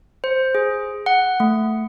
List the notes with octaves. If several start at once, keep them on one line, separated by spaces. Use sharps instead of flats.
C5
G#4
F#5
A3